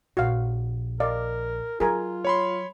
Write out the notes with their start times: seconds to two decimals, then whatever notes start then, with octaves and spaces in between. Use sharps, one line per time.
0.17 A#1 F#4 F5
1.00 A#4 D5 D#5 F5
1.80 F#3 F4 G#4 A#4 G#5
2.25 C#5 B5 C6